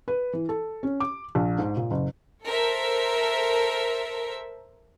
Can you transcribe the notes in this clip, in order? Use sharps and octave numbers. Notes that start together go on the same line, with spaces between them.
B4
E3
A4
C#4
D6
A#1
G#2
A#2
F#1
A4 A#4 C5 E5